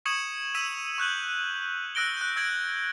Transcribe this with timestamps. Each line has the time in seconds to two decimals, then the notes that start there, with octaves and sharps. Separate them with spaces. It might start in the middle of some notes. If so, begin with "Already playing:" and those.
0.06 C#6 D#6 G#6 C#7 E7 F#7
0.55 E6 B6 D#7 F7
0.98 C#6 F#6 G6 F#7
1.95 E6 F#6 A#6 D7 G7
2.17 F#6 G6
2.36 E6 G#6 A#6 D7